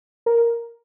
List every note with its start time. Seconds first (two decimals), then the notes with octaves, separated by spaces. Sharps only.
0.26 A#4